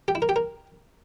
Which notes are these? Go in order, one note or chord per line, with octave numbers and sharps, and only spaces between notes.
G4
E4
A#4
G4
A#4